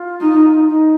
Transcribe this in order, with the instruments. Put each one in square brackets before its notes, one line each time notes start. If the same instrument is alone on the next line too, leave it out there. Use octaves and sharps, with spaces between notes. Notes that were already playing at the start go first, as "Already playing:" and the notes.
Already playing: [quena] F4
[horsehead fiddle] D#4
[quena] D#4
D#4